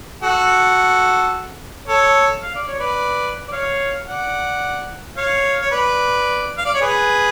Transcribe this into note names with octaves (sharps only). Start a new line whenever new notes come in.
F#4 A4
A4 C#5
F5
D5
C#5
B4 D5
D5
C#5 F5
D5 F#5
C#5 F5
C#5
B4 D5
F5
D5
C#5
G#4 B4